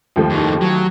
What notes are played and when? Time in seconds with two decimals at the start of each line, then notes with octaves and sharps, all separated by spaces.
0.16 D#2 F3 A3
0.30 F2 D#3
0.61 F#3